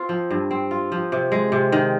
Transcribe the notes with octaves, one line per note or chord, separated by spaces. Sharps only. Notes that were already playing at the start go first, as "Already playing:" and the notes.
Already playing: C4 F4
F3
G2
C4
F4
F3
C3
G#3
C3
D#3